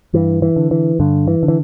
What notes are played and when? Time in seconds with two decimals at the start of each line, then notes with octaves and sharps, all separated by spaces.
0.14 G2 E3
0.42 E3
0.56 D3
0.71 E3
0.99 G2 D3
1.28 E3
1.43 D3
1.48 E3